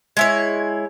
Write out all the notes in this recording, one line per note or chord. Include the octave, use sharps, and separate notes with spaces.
G#3 E4 C#5